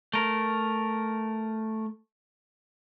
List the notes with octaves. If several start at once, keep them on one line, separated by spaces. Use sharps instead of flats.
A3 A#4